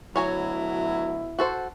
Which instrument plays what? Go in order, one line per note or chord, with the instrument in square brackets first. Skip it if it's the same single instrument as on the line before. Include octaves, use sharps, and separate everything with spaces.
[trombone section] D2 B2 E4 [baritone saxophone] F#3 [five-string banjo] C#5 G#5 A#5
[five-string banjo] F#4 A4 C5